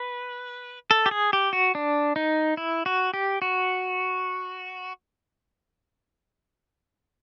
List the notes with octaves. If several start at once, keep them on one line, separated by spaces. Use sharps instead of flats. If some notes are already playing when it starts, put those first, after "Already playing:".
Already playing: B4
A4
G4
G#4
G4
F#4
D4
D#4
E4
F#4
G4
F#4